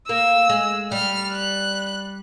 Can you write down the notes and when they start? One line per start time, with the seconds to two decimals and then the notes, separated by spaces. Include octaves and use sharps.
0.08 A#3 E6
0.49 G#3
0.92 G3 F6
1.33 F#6